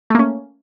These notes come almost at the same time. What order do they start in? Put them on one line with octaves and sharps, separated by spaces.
A3 A#3 C#4